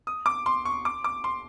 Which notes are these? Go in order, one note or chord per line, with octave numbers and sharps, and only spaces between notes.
D#6
D6
C6
C#6
D6
D6
C6